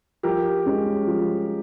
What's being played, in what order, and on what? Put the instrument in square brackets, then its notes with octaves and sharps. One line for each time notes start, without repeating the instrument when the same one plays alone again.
[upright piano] F3 [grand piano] G4 A#4
[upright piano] G#3 C#4
F3